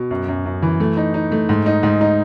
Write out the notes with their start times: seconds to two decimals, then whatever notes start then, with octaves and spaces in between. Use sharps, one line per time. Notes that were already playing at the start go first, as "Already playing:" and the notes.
Already playing: B2
0.11 F#2
0.28 F#2
0.46 F#2
0.62 E3
0.80 A3
0.97 D#4
1.14 D#4
1.32 A3
1.49 G#2
1.66 D#4
1.83 G#2
2.01 D#4